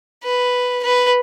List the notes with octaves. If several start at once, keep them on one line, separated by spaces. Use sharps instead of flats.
B4
B4